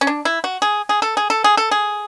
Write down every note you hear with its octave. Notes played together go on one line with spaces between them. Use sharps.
C#4
D4
E4
F#4
G#4
G#4
A4
G#4
A4
G#4
A4
G#4